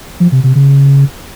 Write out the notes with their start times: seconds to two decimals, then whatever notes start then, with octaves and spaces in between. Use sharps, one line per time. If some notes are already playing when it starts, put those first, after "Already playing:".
0.20 F3
0.32 C3
0.44 C3
0.55 C#3